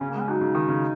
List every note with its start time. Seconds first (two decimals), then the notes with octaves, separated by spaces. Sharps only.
0.01 C#3 C#4
0.11 G#3 A#3
0.21 C#4
0.28 F#3 D#4
0.41 C#3
0.55 D#3
0.69 C#3